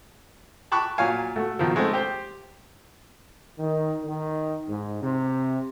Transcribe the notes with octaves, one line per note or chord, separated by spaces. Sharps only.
A5 B5 C#6 D6 F#6
A#2 F#3 C#5 F5 G#5
A3 F#4
B2 D#3 F3
G#3 A3 C4
G4 C5
D#3
D#3
G#2
C3